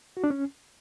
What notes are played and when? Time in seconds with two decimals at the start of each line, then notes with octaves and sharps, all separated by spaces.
0.17 F#4
0.24 D4
0.30 C#4